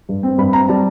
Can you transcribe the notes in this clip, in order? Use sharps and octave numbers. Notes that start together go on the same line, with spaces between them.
G2
C4
G2 B5
C4 A#5
G3 A5